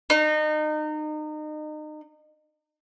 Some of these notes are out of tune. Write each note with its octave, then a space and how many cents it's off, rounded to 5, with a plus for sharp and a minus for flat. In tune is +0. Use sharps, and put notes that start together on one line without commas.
D#4 -30